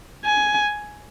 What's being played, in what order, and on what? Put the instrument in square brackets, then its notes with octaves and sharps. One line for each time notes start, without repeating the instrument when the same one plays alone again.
[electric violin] G#5